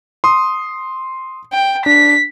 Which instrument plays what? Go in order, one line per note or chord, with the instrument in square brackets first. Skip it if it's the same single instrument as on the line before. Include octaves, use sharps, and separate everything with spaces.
[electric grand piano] C6 D#6
[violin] G5
[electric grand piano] D4 [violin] B6